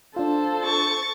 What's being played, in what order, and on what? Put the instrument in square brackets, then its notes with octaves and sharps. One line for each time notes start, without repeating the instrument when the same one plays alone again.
[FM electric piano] D4 F4 [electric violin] A4 C5
[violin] C#6 A6